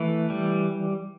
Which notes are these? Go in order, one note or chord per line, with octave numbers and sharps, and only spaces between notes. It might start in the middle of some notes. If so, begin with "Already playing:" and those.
Already playing: E3 A3
G3